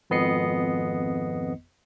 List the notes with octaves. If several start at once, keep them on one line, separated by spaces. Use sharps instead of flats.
G#1 F2 B3 D#5 C7 C#7